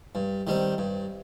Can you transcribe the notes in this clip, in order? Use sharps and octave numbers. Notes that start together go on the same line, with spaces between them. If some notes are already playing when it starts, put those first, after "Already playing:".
G2
D#3 G3 C4
G2